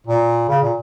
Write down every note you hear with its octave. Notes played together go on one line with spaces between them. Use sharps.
A#2
C#3
A#2